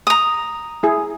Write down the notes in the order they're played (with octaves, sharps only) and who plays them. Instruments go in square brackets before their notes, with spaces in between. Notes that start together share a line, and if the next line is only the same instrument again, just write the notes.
[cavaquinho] A#5 D#6
[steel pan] E4 G#4